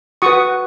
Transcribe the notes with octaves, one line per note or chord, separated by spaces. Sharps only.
F#4 B4 C#6 D#6